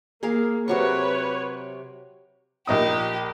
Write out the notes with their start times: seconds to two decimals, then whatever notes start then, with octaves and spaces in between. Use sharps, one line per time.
0.23 A#3 G#4 A#4 F5
0.68 C3 F#3 B4 C#5 C#6
2.67 A#1 D#4 G4 D#6